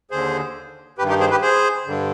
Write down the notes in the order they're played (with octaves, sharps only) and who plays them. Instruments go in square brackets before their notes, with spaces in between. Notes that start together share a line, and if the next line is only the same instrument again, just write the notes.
[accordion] D#2 D3 G#4 C5
G2 G4 B4
D#3
D#4 G4
G#4 C5
G4 B4
G#4 C5
G2 D3